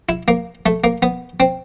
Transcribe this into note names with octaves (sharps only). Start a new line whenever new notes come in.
E4
A#3
A3
A#3
B3
C4